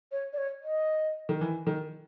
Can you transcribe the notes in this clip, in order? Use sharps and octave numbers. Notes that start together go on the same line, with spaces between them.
C#5
D5
C#5
D#5
D#3
E3
D#3